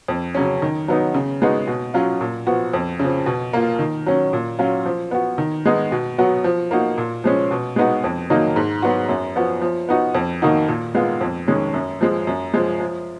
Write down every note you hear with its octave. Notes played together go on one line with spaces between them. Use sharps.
F2
C#3 F#3 C#4
D#3
F#3 B3 D#4
C#3
G#3 B3 D#4 F#4
B2
F#3 C#4 F4
A#2
F3 B3 F#4
F2
C#3 F3
B2
A#3 F4
D#3
F#3 C#4
A#2
F#3 C#4 F4
F3
B3 F#4
D#3
G#3 B3 D#4
B2
F#3 B3 F#4
F3
A#3 D#4 F#4
A#2
F3 G#3 C#4
B2
G#3 B3 D#4 F#4
F2
D#3 F#3 A#3 D#4
G#2
F#3 B3 F#4
F#2
F3 B3 F#4
F3
B3 D#4 F#4
F2
D#3 A#3 D#4 F#4
A#2
G#3 B3 F4
F2
D#3 G#3 C#4
F#2
F3 G#3
F#2
F3 G#3
F3